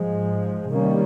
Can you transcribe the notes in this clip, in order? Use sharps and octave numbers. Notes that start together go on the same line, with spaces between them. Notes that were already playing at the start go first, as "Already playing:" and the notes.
Already playing: G#2 F3 G#3
C3 D#3 G3 A#3 C#4